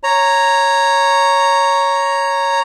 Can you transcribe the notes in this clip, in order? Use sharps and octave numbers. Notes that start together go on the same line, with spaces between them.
C#5 A#5